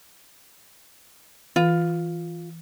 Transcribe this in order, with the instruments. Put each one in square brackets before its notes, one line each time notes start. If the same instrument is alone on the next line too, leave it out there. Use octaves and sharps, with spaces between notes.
[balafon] E3 [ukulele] F4